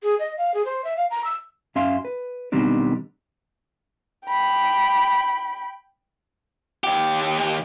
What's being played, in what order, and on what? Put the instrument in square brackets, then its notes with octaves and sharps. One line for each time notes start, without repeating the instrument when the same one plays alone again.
[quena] G#4
D#5
F5
G#4
C5
E5
F5
A#5
E6
[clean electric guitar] F#2 C#4 E5 F5 C6
B4
B1 B2 D#3 G3 C4 D4
[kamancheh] G5 B5
[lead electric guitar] D#2 G4